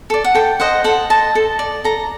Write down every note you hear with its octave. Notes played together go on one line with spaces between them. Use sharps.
A4 D5
F#5
A4 G5
C5 D#5 F#5
A4 F#5
C5 D#5 A5
A4
D5
A4 A#5